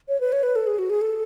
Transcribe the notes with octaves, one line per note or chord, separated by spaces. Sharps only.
C#5
B4
C#5
B4
A4
G#4
F#4
G#4
A4